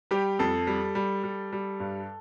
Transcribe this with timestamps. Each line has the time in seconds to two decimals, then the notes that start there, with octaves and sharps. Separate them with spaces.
0.11 G3 G4
0.39 F2 A4
0.67 G3
0.95 G3
1.24 G3
1.53 G3
1.80 G2